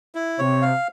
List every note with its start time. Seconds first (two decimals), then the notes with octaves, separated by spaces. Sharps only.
0.15 E4
0.39 C3 C#5
0.62 F5